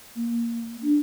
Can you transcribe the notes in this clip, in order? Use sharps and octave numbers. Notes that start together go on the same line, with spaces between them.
A#3
D4